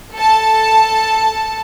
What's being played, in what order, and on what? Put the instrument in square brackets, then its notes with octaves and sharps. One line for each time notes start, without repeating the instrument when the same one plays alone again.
[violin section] A4 A5